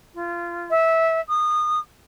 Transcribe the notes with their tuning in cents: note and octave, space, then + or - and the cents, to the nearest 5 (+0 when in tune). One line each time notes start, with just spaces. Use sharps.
F4 -20
E5 -15
D#6 -25